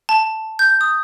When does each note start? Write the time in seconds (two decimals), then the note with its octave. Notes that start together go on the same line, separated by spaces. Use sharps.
0.09 A5
0.59 G6
0.81 D#6